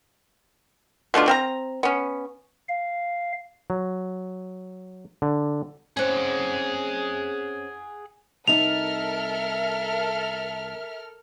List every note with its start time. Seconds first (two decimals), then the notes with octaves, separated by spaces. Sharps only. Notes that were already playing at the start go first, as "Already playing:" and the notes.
1.14 B2 A3 D4 F4
1.28 C4 F5 A#5
1.83 B3 C#4
2.68 F5
3.70 F#3
5.22 D3
5.97 C4 C#4 G#4 F#5
8.48 C2 D#4 A4 A#4 E5 F6 F7